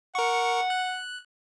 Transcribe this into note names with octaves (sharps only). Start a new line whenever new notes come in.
A#4 F#5 C#6
F#6